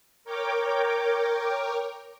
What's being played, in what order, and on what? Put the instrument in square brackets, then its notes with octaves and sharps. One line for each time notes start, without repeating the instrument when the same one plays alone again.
[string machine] A#4 C#5 G5 D6